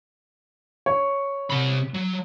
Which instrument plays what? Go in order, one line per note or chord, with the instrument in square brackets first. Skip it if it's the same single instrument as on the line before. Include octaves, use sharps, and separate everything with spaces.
[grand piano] C#5
[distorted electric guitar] C3 B5
F#3